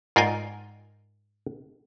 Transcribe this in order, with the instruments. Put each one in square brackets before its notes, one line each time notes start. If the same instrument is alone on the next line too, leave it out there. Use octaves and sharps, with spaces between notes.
[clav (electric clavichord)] G#2 F4 A#4 D5 G5 G#5